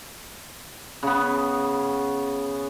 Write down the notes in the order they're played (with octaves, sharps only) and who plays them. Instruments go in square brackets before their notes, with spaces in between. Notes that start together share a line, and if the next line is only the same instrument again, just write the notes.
[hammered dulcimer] C#3 B3